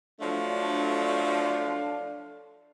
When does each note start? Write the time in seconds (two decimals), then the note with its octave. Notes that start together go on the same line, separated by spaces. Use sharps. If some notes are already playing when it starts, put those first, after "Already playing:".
0.21 F3 F#3 A3 D4 A4 F5